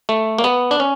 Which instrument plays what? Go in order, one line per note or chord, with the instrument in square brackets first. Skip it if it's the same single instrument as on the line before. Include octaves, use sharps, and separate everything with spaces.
[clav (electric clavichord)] A3
A#3
B3
D4
C#4